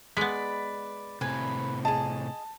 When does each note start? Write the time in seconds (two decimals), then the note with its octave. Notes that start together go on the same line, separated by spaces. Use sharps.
0.17 G#3 B3 B4 D5 B6
1.21 A2 C3 B4 G#5
1.85 G#4 D#5 A5